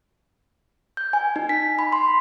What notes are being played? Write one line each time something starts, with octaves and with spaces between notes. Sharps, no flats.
G6
G#5
D#4
B6
B5
C6